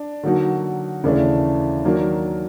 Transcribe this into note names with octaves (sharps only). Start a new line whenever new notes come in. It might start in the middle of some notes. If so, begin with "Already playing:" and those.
Already playing: D4
D3 F#3 A#3 D#4 F#4
D#2 C#3 E3 A3 D4
D#3 F#3 A#3 D4